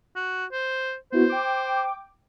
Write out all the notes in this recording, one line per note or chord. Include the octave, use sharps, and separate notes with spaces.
F#4
C5
B3 E4 F#4 C5
G5 D6